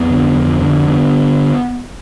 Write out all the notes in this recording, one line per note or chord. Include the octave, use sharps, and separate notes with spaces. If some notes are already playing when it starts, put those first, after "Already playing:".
Already playing: F2 B3
D3
F2
D3
D3 B3